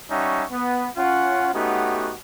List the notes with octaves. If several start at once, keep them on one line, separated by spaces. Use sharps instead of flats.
G3 C#4 D#4 E5 F#5 C#6
B3
C#4 F4 F#5
A3 B3 C#4 D#4 F#4 G4